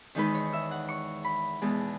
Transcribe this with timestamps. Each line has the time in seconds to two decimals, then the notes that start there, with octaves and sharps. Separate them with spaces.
0.15 E2 D#3 G#3 D#4 B4
0.34 C#5
0.53 E5
0.71 F#5
0.88 C#6
1.24 B5
1.62 E2 B2 G#3 A5